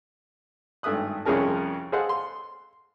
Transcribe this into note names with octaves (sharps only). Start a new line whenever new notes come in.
G#1 G2 A3 E5 D#6 F#6
C2 F2 C#4 G#4 A#4 A5
G#4 A4 C5 D#5 F5 F#5
C6